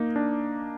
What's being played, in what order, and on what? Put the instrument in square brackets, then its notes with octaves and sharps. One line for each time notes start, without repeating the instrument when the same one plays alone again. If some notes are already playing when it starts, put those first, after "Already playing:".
Already playing: [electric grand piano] A#3 D#4
D4